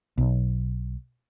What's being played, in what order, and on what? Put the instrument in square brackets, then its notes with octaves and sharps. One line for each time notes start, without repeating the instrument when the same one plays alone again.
[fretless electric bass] B1